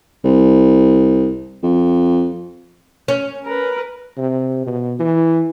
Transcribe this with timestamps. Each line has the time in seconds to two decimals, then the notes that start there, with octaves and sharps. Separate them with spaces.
0.24 C2
1.63 F2
3.08 C#4
3.45 A#4 B4
4.18 C3
4.67 B2
5.00 E3